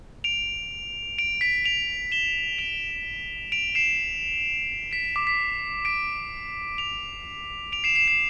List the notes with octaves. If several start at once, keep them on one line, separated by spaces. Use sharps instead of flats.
D7 F7
D7 F7
B6 D7
D7 F7
E7 G7
D7 F7
D7 F7
C7 E7
B6 D7
D6
B6
B6 D7
D7 F7
D7 F7
C7 E7
C7 E7
C7 E7